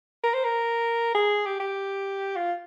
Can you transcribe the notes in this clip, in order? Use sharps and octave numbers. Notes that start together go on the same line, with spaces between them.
A#4
C5
A#4
G#4
G4
G4
F4